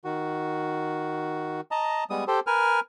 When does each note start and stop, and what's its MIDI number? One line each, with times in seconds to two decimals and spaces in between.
0.05 1.61 51
0.05 1.61 66
1.71 2.04 75
1.71 2.04 81
1.71 2.04 82
2.10 2.24 55
2.10 2.24 56
2.10 2.24 59
2.10 2.24 87
2.28 2.40 67
2.28 2.40 69
2.28 2.40 72
2.47 2.80 70
2.47 2.80 71
2.47 2.80 80
2.47 2.80 89